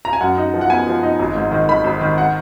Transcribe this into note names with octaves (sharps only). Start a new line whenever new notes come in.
A#5
G#5
F#2 F#5
D#4
F3
F#5
B3 G#5
F3
D#4
G#1
G#2
D#3
D#3 B5
G#1
D#3
F#5